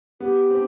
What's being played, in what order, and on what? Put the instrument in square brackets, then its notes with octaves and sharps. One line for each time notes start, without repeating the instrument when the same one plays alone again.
[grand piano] B3 [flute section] G4
[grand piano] C4 [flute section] D4